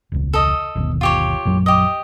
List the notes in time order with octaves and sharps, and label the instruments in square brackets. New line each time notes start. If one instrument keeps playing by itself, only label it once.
[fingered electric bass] E1 C#2
[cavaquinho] A4 D#5
[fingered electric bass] G1 D#2 B2
[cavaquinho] F4 G4 C#5
[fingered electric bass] A#1 F#2 F#3
[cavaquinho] G4 D#5